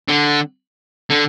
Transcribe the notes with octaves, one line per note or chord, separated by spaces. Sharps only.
D3
D3